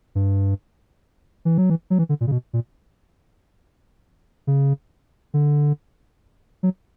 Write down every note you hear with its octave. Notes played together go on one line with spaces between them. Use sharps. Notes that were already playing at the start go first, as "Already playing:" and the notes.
G2
E3
F#3
E3
F#3
E3
D3
A#2
C#3
B2
A#2
C#3
D3
F#3